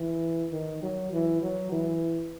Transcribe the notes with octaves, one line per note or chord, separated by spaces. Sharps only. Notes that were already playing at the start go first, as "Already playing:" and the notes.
Already playing: E3
D#3
F#3
E3
F#3
E3